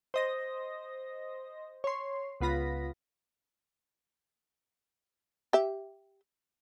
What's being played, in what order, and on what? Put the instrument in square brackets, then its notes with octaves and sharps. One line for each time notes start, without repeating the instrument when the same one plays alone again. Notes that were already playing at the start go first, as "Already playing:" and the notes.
[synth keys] C5 D#5 A#6
C#5 C6
C#2 B3 F4 B5 A#6
[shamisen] G4 E5